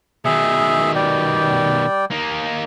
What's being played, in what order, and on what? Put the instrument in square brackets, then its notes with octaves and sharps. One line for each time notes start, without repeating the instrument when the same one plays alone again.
[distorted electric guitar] B2 D#3 [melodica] G#4 E5
[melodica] G3 D5 G5
[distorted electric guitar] A#3 D#4